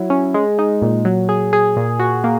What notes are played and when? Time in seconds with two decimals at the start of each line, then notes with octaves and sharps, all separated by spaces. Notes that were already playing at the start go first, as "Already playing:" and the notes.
Already playing: F#3 E4
0.10 C#4
0.34 G#3
0.59 D#4
0.82 A#2
1.05 F#3
1.29 G#4
1.53 G#4
1.76 A#2
1.99 F#4
2.24 A#3